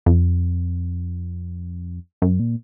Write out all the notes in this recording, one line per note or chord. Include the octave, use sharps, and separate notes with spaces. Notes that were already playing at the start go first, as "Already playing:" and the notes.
F2
F#2
A#2